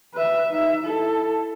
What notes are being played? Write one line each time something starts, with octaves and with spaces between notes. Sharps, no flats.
B4 E5
D#4 E5
E4 A4